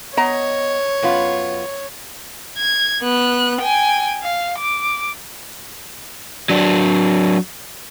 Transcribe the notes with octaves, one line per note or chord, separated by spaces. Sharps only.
B3 C#5 D#5 A#5
F#2 B3 F4
G#6
B3 F#6
G5 G#5
F5
D6
F#3 D4